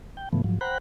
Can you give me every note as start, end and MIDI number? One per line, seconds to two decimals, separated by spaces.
0.17 0.29 79
0.33 0.42 44
0.33 0.42 49
0.33 0.42 52
0.33 0.42 53
0.33 0.42 57
0.33 0.42 59
0.44 0.59 44
0.44 0.59 53
0.44 0.59 54
0.61 0.78 72
0.61 0.78 78
0.61 0.78 79
0.61 0.78 82
0.61 0.78 83
0.61 0.78 90